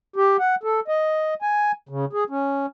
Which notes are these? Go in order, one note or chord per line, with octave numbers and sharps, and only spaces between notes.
G4
F#5
A4
D#5
G#5
C#3
G#4
C#4